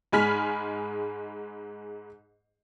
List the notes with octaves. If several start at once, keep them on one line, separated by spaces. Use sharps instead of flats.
G#2 G#3 G#5 B5 F6 B6